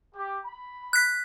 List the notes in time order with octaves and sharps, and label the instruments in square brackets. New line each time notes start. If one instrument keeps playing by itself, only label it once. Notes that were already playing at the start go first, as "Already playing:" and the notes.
[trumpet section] G4
B5
[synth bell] F#6 B6